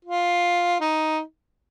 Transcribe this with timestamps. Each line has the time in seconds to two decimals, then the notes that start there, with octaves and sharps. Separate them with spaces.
0.05 F4
0.80 D#4